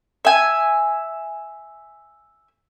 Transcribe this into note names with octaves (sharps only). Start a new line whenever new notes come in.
E5 G#5